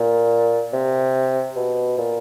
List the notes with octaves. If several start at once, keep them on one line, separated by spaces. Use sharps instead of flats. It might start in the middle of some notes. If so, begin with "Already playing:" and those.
Already playing: A#2
C3
B2
A#2